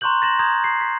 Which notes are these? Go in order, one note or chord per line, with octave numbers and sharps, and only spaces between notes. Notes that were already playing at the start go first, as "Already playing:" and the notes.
A#5 C6 C#6 F#6 G6 F#7
A6 A#6 E7 F#7
A#5 D#6 G6 G#6
C7
B6